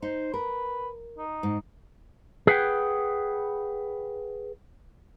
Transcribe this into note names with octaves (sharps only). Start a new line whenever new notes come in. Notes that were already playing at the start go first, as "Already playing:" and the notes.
D#4 C5
A#4 B4
D#4
G#2
G#4 B4 F#5 G5